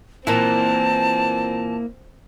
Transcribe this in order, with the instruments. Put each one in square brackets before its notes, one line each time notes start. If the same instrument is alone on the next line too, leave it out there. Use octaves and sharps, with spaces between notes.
[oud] A#2 E3 [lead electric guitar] A#3 E4 [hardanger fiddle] C4 [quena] A5